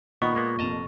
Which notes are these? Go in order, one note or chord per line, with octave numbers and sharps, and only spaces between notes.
A#2 D#3 B3 D#5 F#5 B5 C#6
G#3 A#3 B3
F1 F2 D#5 A5 A#5